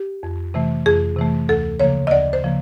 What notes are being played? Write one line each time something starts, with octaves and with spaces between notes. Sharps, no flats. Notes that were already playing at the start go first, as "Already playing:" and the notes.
Already playing: G4
F2
C3 E3 A3
F2 G#4
C3 E3 A3
D2 A4
C#3 F3 A#3 C#5
D#5
D2 D5
C5
C#3 F3 A#3